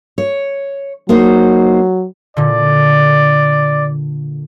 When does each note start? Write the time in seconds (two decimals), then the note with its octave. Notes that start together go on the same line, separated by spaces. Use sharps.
0.18 C#5
1.09 F#3 A#3 D#4 C5
2.37 A#2 D3 D5